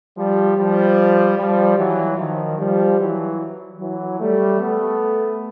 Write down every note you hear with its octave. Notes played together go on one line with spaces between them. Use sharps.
F3 G3
F3 G3
F3 G3
E3 F#3
D#3 F3
F3 G3
E3 F#3
E3 F#3
G3 A3
A3 B3